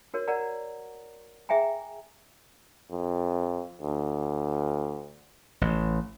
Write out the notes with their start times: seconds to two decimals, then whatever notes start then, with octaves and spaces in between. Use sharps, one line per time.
0.14 F#4 A#4 C#5
0.28 A#4 D5 F#5 A#5
1.49 G#4 E5 G5 G#5 A#5
2.91 F2
3.82 D2
5.61 A1